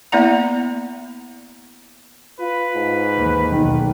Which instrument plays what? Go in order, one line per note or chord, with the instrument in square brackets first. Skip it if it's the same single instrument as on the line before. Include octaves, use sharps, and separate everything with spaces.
[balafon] A#3 B3 E4 D5 F#5 A#5
[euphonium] F4 [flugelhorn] B4
[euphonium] G#2
[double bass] D#2 E3
[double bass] B1 E2 [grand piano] D#3